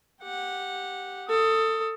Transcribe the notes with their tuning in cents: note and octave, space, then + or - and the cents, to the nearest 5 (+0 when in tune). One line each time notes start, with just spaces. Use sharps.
G4 +0 F#5 -15
A4 +25 D#6 +10